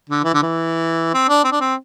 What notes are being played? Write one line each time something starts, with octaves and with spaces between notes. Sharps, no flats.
D3
E3
D3
E3
C4
D4
C4
D4
C4